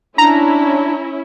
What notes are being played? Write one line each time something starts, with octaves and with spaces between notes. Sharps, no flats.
C#4 D4 E4 A#5